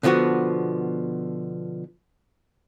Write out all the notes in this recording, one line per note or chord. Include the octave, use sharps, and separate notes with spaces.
B2 D3 F3 B3 F#4